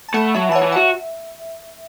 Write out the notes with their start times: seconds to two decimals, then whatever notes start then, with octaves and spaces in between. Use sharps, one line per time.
0.09 A5
0.14 A3 F#5 B5
0.34 F#3 E5 A5
0.49 E3 A5
0.55 C#5 F#5
0.62 E3
0.72 F#5
0.76 F#4 E5